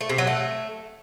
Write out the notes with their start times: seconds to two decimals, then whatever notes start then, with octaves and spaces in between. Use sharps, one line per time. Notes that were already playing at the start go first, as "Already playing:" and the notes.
0.01 A3
0.09 C3
0.18 F#3
0.27 A3